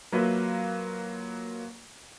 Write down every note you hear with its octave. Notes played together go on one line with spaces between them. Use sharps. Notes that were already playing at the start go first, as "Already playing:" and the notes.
F#3 A#3 F4 B4 E5